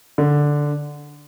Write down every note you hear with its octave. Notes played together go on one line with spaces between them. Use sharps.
D3